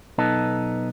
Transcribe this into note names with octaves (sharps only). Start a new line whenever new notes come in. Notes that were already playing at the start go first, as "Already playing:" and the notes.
B1 B3 D#4 A4